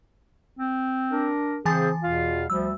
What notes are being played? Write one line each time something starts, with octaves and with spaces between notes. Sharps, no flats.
C4
D4 A#4
C#3 E3 C4 G#4 C5 G#5 A6
E2 B2 F4 F5
D2 F3 G3 E6